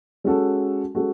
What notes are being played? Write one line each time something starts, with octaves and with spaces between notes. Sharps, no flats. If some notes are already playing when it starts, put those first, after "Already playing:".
G#3 C#4 F#4 A4
G#3 C#4 F#4 A4